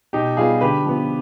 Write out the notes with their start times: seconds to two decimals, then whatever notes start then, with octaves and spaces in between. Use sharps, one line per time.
0.13 B2 D#4 G4
0.37 G3 B3 F4 G#4
0.61 D3 G4 B4
0.86 F3 B3